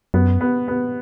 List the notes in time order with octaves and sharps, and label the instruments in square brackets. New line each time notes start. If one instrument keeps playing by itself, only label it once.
[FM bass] F#2 [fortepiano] B3
[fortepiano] B3
B3